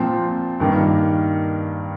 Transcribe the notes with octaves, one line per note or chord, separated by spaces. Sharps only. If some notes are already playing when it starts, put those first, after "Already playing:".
Already playing: A#2 F3 C4
G2 D#3 A#3